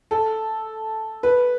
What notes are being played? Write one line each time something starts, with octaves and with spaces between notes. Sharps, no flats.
A4
B4